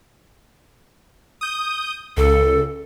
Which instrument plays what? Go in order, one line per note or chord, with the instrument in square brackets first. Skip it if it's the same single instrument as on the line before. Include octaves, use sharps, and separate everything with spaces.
[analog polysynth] D#6 G6
[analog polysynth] C#2 [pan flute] A4